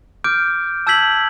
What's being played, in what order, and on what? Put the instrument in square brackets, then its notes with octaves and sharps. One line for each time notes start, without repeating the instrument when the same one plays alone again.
[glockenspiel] D6 F6 G6 D7
A5 E6 G6 G#6 B6 F#7